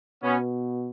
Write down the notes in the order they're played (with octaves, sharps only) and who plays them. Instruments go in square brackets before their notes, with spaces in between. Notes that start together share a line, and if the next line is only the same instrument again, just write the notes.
[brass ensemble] B2 B3 C#4